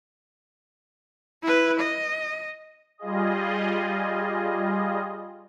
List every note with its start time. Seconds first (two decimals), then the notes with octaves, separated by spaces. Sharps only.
1.43 E4 B4
1.80 D#5
2.98 G3 F4 G#4 D#5